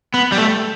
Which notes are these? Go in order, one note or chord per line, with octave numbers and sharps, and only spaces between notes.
B3
G3
A3